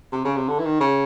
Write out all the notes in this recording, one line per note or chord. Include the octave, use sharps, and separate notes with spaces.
C3
C#3
C3
D3
E3
D#3
C#3